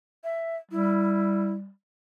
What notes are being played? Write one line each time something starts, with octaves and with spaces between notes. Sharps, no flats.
E5
G3 E4